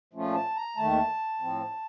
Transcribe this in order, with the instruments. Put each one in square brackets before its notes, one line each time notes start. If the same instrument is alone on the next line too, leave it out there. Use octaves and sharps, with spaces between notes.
[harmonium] A#2 F3 A3 C#4 F4
A5
A#5
D#2 D#3 A3 A5
A2 F3 C4